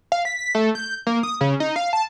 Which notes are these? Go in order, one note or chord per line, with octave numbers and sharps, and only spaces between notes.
F5
B6
B6
A3
G6
A#3
D#6
C#3
D#4
F5
A5